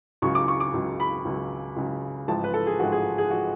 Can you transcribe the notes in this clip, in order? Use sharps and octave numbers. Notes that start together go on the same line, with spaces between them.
C#2 C#3 F#3 C#6
D6
C#6
D6
C#2 C#3 F#3
B5
C#2 C#3 F#3
C#2 C#3 F#3
A1 G#2 F3 A5
B4
A4
G#4
A1 G#2 F3 F#4
G#4
G#4
F3 F#4